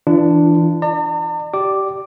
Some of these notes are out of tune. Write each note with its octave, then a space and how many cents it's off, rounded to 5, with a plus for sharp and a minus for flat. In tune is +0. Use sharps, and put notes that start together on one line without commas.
E3 +5 D4 +0 F4 -45
D5 +35 A#5 -45
G4 -20 D5 +0 D6 +0